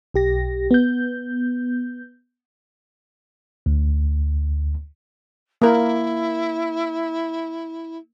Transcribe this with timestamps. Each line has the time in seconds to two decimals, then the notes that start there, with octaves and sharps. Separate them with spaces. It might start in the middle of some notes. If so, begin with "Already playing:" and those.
0.14 B1 G4 A#6
0.71 B3 G6
3.66 D2
5.62 A#3 E4 A#4